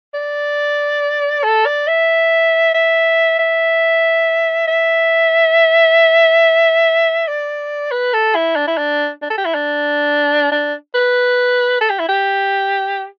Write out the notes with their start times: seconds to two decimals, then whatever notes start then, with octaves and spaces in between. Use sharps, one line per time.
0.14 D5
1.44 A4
1.66 D5
1.88 E5
2.74 E5
3.39 E5
4.67 E5
7.28 D5
7.91 B4
8.14 A4
8.35 E4
8.56 D4
8.67 E4
8.77 D4
9.22 D4
9.30 A4
9.38 G4
9.45 E4
9.54 D4
10.52 D4
10.95 B4
11.81 A4
11.90 G4
11.99 E4
12.08 G4